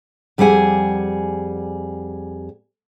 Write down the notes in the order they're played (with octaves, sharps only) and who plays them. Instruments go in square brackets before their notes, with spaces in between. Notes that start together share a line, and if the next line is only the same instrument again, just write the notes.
[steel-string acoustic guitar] F2 G3 G4 G#4 F#5 G#5